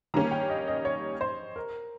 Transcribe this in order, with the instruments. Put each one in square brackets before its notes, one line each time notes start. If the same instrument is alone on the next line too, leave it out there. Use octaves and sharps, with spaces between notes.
[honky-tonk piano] D#3 G3 A#3 C#4 G4 [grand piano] A#5
[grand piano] G5
D#5
D#5
C#5
C5
A#4